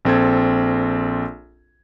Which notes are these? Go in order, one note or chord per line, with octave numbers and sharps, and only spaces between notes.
A#1 C4 A4 G#6